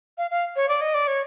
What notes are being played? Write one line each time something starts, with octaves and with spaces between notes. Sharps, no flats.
F5
F5
C#5
D5
D#5
D5
C#5